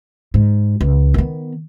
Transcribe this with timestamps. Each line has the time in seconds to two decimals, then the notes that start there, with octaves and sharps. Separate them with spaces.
0.34 G#2
0.81 C#2
1.14 D#3 B3